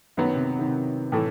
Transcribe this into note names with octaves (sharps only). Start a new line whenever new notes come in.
F#2 D#3 F#3 B3
C3
D#3
C3
A2 E3 A3 E4